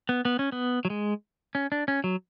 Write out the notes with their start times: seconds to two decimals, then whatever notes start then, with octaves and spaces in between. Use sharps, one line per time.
0.09 B3
0.25 B3
0.39 C#4
0.52 B3
0.85 F#3
0.90 G#3
1.55 C#4
1.72 D4
1.88 C#4
2.04 F#3